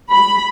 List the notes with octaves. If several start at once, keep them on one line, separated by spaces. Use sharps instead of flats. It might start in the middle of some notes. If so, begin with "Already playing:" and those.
B5